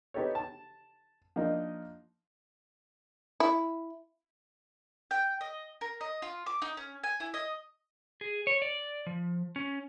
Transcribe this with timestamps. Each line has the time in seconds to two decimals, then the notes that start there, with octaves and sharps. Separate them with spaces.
0.14 B3 D#4 G4 A4 C#5
0.35 A5
1.36 F3 A#3 D4 D#4 D#5
3.40 E4
5.11 G5
5.41 D#5
5.81 A#4
6.01 D#5
6.22 F4
6.46 D6
6.62 D#4
6.77 C#4
7.03 G#5
7.20 E4
7.34 D#5
8.21 G#4
8.47 C#5
8.62 D5
9.06 F3
9.56 C#4